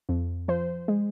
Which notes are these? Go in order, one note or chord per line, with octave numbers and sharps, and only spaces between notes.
F2
F3 C5
G#3